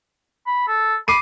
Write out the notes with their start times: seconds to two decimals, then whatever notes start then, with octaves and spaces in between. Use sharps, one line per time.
0.46 B5
0.68 A4
1.08 B5 D6 C7 D#7